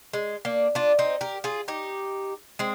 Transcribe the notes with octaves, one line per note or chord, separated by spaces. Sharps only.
G#3
A#3 D4
D4 F4
C4 D#4
G4 A#4
F4 G#4
D#4 G4
G#3 C4